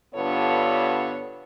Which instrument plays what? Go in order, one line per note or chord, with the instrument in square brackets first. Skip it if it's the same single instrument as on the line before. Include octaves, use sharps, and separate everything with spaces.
[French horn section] G2 D3 B3 F4 A4 C#5